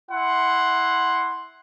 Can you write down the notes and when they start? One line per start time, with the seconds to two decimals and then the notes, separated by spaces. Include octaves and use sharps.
0.11 E4 F#5 C6